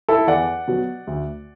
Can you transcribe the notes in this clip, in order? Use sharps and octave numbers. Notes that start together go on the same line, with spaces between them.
E4 A4
E2 D5 F#5
B2 F#3
D2